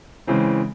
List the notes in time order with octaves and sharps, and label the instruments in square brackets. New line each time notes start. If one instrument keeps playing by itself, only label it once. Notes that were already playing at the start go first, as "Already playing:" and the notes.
[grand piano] C#3 E3 G#3 C4